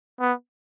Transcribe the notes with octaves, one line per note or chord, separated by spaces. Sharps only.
B3